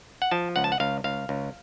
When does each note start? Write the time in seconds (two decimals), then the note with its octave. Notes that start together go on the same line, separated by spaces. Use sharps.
0.22 F#5
0.31 F3 A5
0.56 C#2 F#5
0.64 A5
0.72 F#5
0.80 C#2 F5
1.04 C#2 F5
1.29 C#2